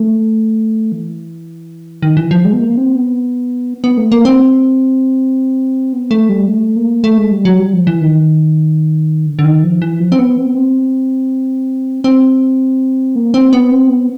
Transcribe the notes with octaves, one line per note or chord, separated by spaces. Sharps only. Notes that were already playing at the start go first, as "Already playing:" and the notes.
Already playing: A3
E3
D#3
E3
F3
G#3
B3
A#3
C4
B3
B3
A3
A#3
C4
B3
A3
G3
A3
A#3
A3
G#3
G3
F#3
G3
F3
E3
D#3
D3
D3
D#3
F3
E3
F3
C4
B3
C4
B3
C4
C4
A#3
C4
B3
C4
B3